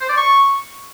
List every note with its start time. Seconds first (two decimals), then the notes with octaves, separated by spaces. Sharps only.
0.01 C5
0.09 D5
0.17 C#6